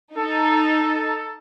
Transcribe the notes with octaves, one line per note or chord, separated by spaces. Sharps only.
D#4 A4